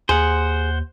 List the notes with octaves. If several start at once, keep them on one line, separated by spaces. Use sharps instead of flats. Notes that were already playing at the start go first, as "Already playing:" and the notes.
D#2 G#4 C5 F#5